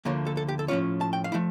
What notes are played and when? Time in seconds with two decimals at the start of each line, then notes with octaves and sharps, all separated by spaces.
0.05 D2 D3 F3 A#3 C#5
0.27 A4
0.37 A4
0.48 G4
0.59 A4
0.68 A2 F3 C#4 F4 C#5
1.01 A5
1.13 G5
1.24 F5
1.32 F3 A3 E4